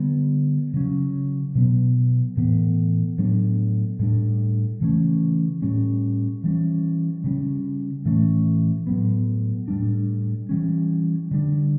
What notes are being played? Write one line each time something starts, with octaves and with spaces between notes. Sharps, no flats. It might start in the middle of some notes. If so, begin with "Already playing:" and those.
Already playing: D3 G3 B3
C#3 F#3 C#4
B2 F#3 B3
A2 E3 B3
A2 F#3 B3 D4
A2 G3 D4
C#3 E3 A3 C#4
A2 G3 C#4
E3 G3 C#4
C#3 G3 C#4
A2 E3 A3 C#4
A2 F#3 B3
A2 G3 D4
E3 G3 C#4
D3 G3 D4